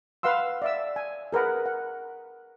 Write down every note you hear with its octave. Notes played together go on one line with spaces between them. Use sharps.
B4 F5 F#5 C6 E6
D5 E5 E6
G#5
G#4 A#4 B4 F#5
F#5